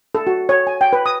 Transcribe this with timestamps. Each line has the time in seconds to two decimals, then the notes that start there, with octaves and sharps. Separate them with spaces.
0.15 A4
0.27 F#4
0.49 C#5
0.67 G#5
0.81 G5
0.93 B4
1.06 D#6